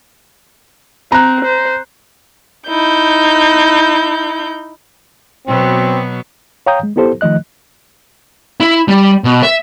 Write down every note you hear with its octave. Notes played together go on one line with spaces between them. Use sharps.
C4 A#5 F#6
C5
D#4 E4 G6
B2 F#3 B3 C4
C#5 F5 G5 A#5 D#6 G6
G#3
B3 E4 G4 A4 C5
D#3 F3 A3 D#5 F#6
E4
G3
B2
E5